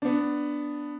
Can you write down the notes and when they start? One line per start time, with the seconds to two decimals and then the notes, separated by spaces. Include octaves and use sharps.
0.02 B3 D4